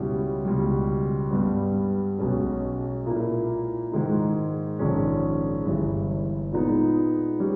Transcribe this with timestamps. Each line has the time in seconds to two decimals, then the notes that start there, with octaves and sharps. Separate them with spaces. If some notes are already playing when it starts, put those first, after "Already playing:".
Already playing: C#2 B2 G3 C#4 E4
0.45 C#2 B2 G3
1.31 G2 G3 B3
2.19 B1 B2 G#3 C#4
3.06 A#2 A#3 E4
3.92 G#2 D#3 G#3 D#4
4.79 A#1 G#2 D#3 G#3 C#4
5.66 G1 G2 E3
6.52 A#2 G#3 B3 D#4
7.40 G3 C#4